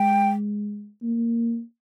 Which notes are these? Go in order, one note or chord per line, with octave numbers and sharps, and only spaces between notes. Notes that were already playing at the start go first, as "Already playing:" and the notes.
Already playing: G#3 G5
A#3